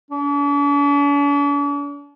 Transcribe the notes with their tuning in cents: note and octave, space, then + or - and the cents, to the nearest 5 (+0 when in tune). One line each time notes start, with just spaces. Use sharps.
D4 -45